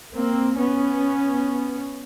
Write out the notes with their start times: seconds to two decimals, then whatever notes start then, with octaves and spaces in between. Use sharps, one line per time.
0.13 A#3 C4
0.57 B3 C#4